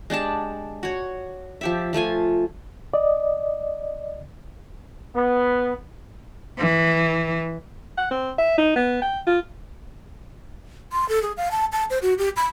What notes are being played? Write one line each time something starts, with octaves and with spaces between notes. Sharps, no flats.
G#3 D4 G4 A5
F#4 C#5
F3 G4 E5
F3 A3 F4 G#5
D5 D#5
B3
E3
F#5
C4
E5
D#4
B3
G5
F4
C6
A4
G#4
F5
A5
A5
C5
F#4
G4
B5